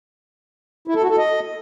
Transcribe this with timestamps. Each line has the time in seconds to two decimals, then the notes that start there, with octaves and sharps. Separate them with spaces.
0.88 E4
0.95 A4
1.02 F#4
1.10 A4
1.17 D#5